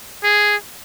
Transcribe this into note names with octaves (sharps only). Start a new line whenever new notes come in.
G#4